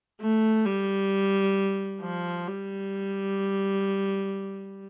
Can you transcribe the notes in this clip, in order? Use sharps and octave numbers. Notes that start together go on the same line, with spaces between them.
A3
G3
F3
G3